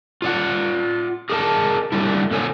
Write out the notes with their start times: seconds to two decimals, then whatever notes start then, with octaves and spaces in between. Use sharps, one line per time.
0.22 F4 D5 F#5
1.30 G#4 A#4 D5 D#5 A5
1.92 D3 G3 A3 D4 E4
2.31 A#2 D3 A4 C5 C#5 G#5